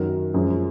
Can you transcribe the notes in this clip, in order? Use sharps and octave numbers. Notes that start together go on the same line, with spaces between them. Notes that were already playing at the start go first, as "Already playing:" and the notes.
Already playing: F#2 D#3 F#3 A#4
F#2 F3 G#3